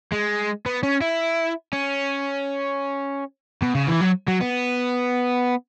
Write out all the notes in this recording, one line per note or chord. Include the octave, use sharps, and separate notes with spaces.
G#3
B3
C#4
E4
C#4
B2
C#3
E3
F#3
F#3
B3